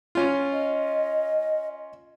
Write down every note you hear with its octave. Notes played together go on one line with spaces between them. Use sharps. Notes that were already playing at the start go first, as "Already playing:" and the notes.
C#4 F4
D#5